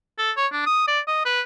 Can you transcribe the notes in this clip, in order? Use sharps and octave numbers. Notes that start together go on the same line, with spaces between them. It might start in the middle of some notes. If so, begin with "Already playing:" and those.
A4
C#5
D4
D#6
D5
D#5
B4